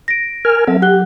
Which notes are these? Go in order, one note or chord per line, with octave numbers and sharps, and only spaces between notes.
A#6 D7
A#4 G#5 F6
F#3 C4 A4 E5
G4 F#5 F#6 G7